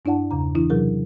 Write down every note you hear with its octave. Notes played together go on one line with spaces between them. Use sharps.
G2 D4 E4 D5 F#5 A5
E2 C#3 A#5
E3 D4 E4
C3 E3 F#3 C#4 G#4 A#4